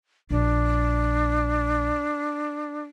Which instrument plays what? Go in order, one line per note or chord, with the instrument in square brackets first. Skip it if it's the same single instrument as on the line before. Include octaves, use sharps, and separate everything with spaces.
[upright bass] A#1 [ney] D4